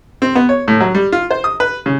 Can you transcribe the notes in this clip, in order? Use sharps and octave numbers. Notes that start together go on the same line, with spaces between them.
C4
B3
C#5
A2
F#3
G3
F4
C5
D#6
B4
C#3